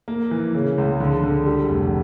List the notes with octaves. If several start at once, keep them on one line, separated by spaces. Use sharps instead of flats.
A#3
E3
C#3
C#2
D3
D3
G3
F1